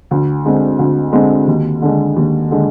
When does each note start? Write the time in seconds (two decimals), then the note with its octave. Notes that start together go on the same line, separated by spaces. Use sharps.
0.11 D2
0.45 D3 G#3 C4
0.79 D2
1.13 D3 G#3 C4
1.47 D#2
1.82 D3 G#3
2.16 D#2
2.51 D3 G#3